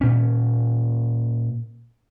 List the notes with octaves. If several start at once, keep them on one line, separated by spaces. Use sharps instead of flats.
A#2 C#4